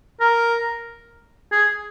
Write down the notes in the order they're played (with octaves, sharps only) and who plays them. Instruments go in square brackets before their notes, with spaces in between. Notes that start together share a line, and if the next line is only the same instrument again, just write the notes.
[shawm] A#4
G#4